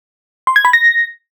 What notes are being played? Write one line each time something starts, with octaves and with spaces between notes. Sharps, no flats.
C6
G#6
B5
A#6